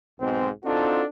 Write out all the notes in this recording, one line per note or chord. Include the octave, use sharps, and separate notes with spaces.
B1 G#2 B2 G#3 C4
C4 D4 D#4 F4 F#4 A4